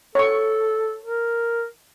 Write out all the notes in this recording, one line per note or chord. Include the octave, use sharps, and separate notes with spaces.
A4 C#5 C#6
A#4